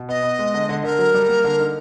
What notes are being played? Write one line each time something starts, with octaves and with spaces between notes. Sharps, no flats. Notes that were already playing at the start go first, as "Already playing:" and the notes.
Already playing: B2
B3 D#5
B3
G#3
D3
D3
D3 A#4
F#3
G3
A#3
D3
D#4